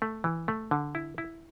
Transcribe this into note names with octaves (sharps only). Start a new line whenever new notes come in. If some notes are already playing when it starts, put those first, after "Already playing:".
A3
E3
A3
D3
E4
E4